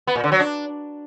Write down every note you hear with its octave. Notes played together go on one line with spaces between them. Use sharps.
B3
A#2
D3
F#3
D4